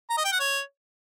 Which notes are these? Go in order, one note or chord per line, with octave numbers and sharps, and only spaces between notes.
A#5
D#5
G5
F#5
C#5